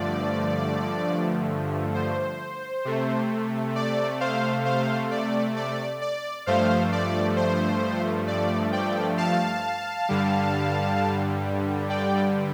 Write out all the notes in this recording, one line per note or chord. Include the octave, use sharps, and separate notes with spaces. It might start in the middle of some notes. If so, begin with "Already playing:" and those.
Already playing: G2 D3 F3 A3 D5
C5
C3 A3
D5
C5 F5
C5 F5
D5
D5
D5
G2 F3 A3 C5 F5
D5
C5
D5
D5 G5
F5 A5
G2 D3 G3
D5 G5